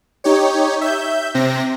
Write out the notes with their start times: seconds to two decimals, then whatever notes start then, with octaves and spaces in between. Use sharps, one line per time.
0.24 D#4 G4 C#5
0.81 E5 G6
1.34 C3 C4 A#6